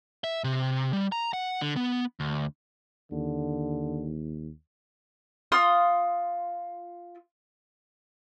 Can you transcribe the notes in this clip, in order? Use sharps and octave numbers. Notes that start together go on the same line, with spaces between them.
E5
C3
G3
A#5
F#5
D3
B3
D2
D#2 D3
F4 C6 D#6